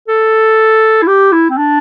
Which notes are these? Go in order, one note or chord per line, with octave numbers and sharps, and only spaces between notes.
A4
E4
G4
E4
C4
D4